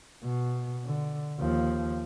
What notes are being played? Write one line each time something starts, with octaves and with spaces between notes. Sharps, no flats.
B2
D3
D#2 F3